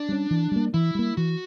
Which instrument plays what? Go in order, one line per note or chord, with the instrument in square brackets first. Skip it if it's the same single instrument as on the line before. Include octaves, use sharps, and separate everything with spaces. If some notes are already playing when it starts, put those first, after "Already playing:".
Already playing: [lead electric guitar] D4
[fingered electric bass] G3 C#4
E3
G3 A#3
[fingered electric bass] E3 [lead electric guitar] E4
[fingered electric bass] G3 A#3
[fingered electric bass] E3 [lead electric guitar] F#4